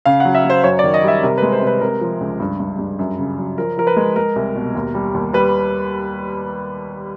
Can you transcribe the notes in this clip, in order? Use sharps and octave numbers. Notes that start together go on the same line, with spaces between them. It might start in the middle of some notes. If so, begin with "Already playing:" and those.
C#3 F5
F#3 F#5
E5
F#3 C5
F#2 C#5
D#3 D5
D#5
G3 E5
C3 A#4
G#3 B4
C5
C3 B4
C3 A#4
F3
C#2
G2
G2
G2
F#2
C#3
F#3
F3 A#4
F3 A#4
B4
G#3
G#3 A#4
C2
B2
D#2
G3
D#2
G3 B4